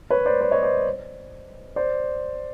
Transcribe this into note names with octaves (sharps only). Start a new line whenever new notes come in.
B4 C#5
C5 D5
C5 D5
C#5 D#5
C5 D5
C5 D5